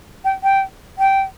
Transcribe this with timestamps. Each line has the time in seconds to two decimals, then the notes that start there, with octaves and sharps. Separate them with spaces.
0.25 G5
0.43 G5
0.99 G5